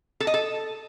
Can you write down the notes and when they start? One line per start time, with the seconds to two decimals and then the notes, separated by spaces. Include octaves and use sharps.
0.20 A4
0.27 D#5
0.34 A4